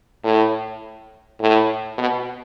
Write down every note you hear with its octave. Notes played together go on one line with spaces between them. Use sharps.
A2
A2
B2